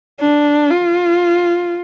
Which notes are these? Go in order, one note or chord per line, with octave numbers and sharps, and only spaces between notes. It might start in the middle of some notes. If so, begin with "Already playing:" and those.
D4
F4